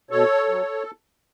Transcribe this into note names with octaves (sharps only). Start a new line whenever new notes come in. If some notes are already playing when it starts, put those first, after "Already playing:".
B2 A4 C#5
F#3